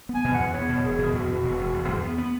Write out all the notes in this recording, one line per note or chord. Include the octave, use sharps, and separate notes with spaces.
B3
G#5
B2
E2 F#5
B3 C#5
B2
E1 G#4
B2
E2 F#4
B2
E1
E1
E1
E2
B3
B3